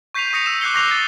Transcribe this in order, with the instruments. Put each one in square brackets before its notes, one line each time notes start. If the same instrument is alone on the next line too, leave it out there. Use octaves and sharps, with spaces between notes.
[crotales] C#6 G6 B6 C7 D#7 F7
C#6 D#6 A#6 C#7 D#7 F7
E6 E7
D6 F#6 G6 C7 C#7 G7
C#6 D6 A#6 C7 F7 G7
A6 G7